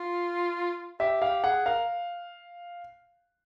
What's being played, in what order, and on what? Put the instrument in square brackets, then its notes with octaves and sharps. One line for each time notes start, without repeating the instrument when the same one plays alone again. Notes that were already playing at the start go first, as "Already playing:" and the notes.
Already playing: [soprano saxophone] F4
[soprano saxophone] G4 [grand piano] E5
[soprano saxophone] G4 [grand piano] F5
[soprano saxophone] G#4 [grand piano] F#5
[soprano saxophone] A#4 [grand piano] F5